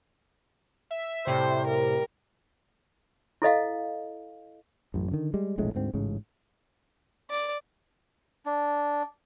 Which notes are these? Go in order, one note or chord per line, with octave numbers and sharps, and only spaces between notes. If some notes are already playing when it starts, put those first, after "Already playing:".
E5
A2 C3 G3 C5
A#4
E4 A4 D#5 F5
A1 F#2
D3 D#3
G3 G#3
E1 A#1 A2 G#3
D2 G#2 C4
A1 G#2 C#3
D5
D4